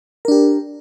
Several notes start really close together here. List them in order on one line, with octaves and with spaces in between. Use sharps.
A#4 D4 G4